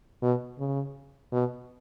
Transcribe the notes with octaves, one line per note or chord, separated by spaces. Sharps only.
B2
C#3
B2